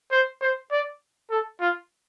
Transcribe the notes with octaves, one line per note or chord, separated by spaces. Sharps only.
C5
C5
D5
A4
F4